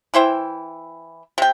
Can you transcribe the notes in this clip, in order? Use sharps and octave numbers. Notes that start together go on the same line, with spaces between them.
E3 E4 C5 G5
C3 G5